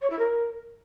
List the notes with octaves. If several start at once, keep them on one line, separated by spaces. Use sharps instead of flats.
C#5
E4
A#4